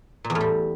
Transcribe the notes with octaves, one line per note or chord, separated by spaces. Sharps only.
A#2
E2
A2
G3